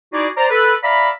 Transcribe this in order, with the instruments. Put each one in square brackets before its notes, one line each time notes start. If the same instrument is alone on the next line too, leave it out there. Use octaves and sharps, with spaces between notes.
[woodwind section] D#4 E4 F#4 G#4 D5
C5 D5 A#5
A4 B4
D5 E5 F5 A#5 B5